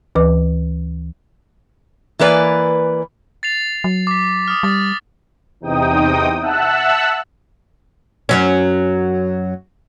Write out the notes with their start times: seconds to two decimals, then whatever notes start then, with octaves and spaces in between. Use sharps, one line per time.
0.15 D2 E3 B4 D6
2.19 E3 A#3 B4 D5 G#5
3.43 A6 C7 F7
3.84 F#3
4.07 D6 B6
4.48 D#6 F6
4.63 G3 D#6 A6
5.61 E2 C3 D#4 G5 D#6
6.41 E5 F#5 A5 E6 F#6
8.29 F#2 F#3 C#4